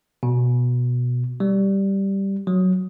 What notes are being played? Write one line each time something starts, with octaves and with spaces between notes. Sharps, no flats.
B2
G3
F#3